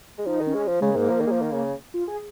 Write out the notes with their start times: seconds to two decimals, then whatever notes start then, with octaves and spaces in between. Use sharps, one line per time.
0.18 G#3
0.26 F3 D#4
0.41 D#3
0.47 C#4
0.55 G#3
0.68 F3
0.81 C#3 G#3
0.89 A#3
0.96 G#2
1.10 F3
1.21 D#3
1.27 G#3
1.31 F3
1.42 D#3
1.52 C#3
1.94 F4
2.08 G#4